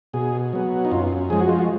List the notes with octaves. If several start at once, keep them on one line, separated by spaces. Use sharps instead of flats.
B2 G#4
F#3 B3
D#4
F#2 F4
F3 G#3 G#4
F#4
F4
F#4